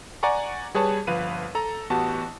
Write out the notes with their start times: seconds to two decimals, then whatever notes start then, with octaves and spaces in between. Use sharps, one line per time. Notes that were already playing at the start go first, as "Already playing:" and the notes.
0.23 D5 F#5 G#5 A#5 C#6
0.74 G3 G#4 B4 C#5 A5
1.07 G1 F3 B4 F5 D#7
1.55 A4 A#5
1.90 A1 B3 F#4 G4 A5